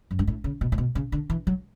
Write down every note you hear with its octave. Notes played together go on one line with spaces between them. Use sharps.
F#2
G2
A2
C#3
B2
A2
B2
C#3
D3
E3
F#3